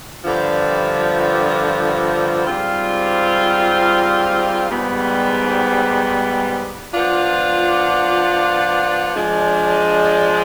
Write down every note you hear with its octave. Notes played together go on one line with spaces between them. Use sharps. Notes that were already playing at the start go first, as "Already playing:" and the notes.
G2 D3 F3
G#2 G3 C4 F4
G#2 G3 B3
F3 B3 D4 F4
F3 G#3 D4